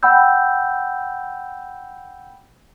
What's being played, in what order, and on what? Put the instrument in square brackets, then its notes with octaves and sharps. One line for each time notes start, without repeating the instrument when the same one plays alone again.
[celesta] F#5 G5 B5 E6 G6